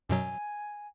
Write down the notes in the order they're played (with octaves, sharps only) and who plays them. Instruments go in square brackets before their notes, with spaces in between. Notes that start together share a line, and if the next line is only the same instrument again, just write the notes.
[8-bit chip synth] F#2 B2 F#3 [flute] G#5